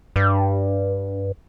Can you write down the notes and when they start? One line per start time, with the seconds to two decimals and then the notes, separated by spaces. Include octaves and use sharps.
0.16 G2